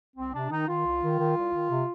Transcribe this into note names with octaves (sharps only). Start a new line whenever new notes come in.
C2 C4
C3 D4
D#3 D#4
D#3 F4
C2
D#3
D#3
C2
D#3
C3